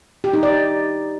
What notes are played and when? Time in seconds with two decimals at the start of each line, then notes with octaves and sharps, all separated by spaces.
0.24 G4
0.33 D#4
0.43 D5